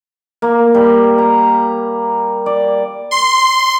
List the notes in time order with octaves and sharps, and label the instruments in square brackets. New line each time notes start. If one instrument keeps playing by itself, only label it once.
[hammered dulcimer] A#3
G3
A#5
D5
[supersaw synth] C6